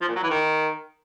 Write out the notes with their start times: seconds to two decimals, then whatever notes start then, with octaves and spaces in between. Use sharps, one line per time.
0.01 F3
0.08 A#2
0.16 F#3
0.23 E3
0.30 D#3